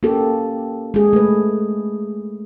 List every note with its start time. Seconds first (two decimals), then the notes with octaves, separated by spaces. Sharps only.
0.03 A#3 C#4 F#4 G4 A4
0.94 G#3 G#4
1.13 A3 B4